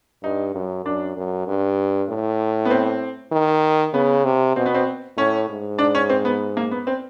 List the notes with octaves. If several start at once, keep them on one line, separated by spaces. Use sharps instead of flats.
G2 D#4
F#2
F#2 D4
F#2
G2
A2
B3
C4
D#3
C#3 B3
C3
B2 C4
B3
C4
A2 C#4
G#2
D4
C#4
C4
B3
A#3
B3
C4